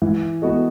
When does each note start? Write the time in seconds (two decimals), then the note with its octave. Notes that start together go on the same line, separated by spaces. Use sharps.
0.02 E3
0.42 B3 F#4 A4 D#5